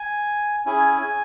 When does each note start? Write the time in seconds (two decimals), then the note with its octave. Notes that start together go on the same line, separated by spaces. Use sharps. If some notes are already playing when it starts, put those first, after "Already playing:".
Already playing: G#5
0.66 C#4 E4 G#4 G#5